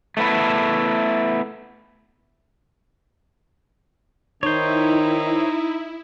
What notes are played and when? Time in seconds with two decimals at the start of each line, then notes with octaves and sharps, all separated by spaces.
0.17 A3 B3 E4
4.43 D#3 D#4 E4 C5 C#5